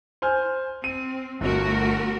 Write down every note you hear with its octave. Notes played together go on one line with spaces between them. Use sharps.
C5 G#5 F6
C4 D#7
G1 A3 F#4 A#4